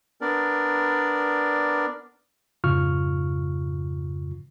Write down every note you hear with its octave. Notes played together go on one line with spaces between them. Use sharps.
B3 D4 A#4 D5
F2 G#2 C#3 F4 C#6 F6